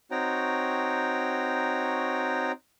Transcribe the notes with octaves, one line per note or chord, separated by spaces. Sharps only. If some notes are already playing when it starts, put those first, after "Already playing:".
C4 D#4 F#4 C#5 G5 A#5